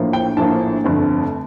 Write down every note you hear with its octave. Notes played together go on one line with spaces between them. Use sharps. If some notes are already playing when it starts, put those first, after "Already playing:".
Already playing: A#1 A2 F3 A#3
G5
A#1 A2 F3 A#3 A5
G1 F2 D3 A3 C4